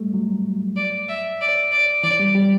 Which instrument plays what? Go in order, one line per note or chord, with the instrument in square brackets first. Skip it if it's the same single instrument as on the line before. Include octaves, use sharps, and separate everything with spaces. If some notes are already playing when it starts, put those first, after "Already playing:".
Already playing: [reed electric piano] G3 A3
F#3
[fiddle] D5
E5
D5
D5
[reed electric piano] E3 [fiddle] D5
[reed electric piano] G3
G3